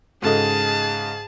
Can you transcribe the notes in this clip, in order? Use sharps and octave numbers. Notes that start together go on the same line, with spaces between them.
G#2 C#3 F#4 G#4 A4 D#5 A5